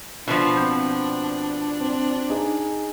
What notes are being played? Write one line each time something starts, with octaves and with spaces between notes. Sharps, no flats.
B2 F3 D4
C4 G6
C4
D#4 G#4